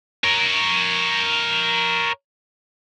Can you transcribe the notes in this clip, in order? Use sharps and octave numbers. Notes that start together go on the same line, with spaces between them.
A#4 C#5